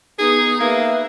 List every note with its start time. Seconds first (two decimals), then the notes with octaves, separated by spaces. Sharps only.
0.19 B3 D#4 G#4
0.60 A#3 B4 E5